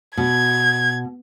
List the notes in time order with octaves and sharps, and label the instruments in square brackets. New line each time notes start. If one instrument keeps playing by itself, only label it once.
[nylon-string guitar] B2 [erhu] G#6